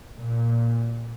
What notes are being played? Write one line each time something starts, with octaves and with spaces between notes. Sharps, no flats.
A#2